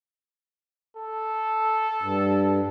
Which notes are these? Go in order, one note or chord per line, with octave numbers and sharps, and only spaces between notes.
A4
G2